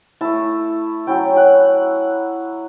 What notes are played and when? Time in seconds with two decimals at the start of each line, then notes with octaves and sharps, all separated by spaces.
0.21 A3 E4 A5
1.07 F#3 C#4 E4 G5
1.37 F#5